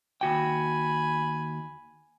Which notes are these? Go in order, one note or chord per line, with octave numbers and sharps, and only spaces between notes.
D#2 F#4 G5 G#5 B5